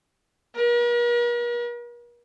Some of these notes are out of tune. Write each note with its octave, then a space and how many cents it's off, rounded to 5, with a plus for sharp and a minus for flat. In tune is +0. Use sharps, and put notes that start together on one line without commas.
A#4 +45